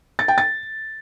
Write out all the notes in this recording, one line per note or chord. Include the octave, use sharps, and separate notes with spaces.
A6
G5
A6